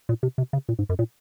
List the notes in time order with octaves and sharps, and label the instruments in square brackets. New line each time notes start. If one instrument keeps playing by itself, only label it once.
[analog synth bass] A#2
C3
C3
C#3
A#2
G#2
F#2
A#2